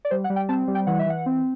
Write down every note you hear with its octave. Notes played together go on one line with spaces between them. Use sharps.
D5
G3 C5
F#5
G3
G5
C4 A5
G3
G5
E3 F#5
E5
E3 F#5
C4